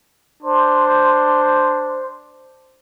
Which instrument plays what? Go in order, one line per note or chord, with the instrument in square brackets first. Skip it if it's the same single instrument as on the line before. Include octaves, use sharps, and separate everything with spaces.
[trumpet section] D4 C5